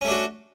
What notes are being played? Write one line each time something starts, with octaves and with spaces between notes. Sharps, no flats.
A3 C#4 D4 F#4